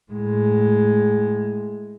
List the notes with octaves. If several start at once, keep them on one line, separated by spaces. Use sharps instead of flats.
A2 G#3